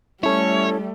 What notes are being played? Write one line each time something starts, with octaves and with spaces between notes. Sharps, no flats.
G3 A3 C#4 E4 A4 C#5